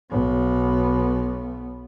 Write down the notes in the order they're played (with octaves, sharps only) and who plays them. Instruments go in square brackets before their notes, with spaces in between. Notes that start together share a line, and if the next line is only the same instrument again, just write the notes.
[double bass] B1 B3